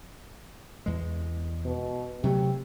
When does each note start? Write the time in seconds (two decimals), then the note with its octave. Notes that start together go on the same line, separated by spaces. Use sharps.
0.86 E2 G#3
1.65 B2
2.24 C3 F#3 A3 G4